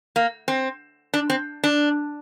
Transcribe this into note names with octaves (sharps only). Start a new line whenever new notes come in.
A#3
C4
D4
C4
D4